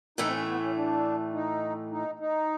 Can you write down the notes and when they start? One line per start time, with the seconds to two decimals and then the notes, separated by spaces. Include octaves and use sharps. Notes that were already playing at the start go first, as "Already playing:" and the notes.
0.18 A2 E3 A3 D#4
0.26 C4
0.33 C#4
0.47 B3
0.62 C#4
0.76 D4
1.33 D#4
1.91 D#4
2.19 D#4